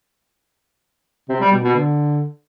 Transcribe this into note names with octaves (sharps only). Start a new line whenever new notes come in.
C3
G3
B2
B2
D3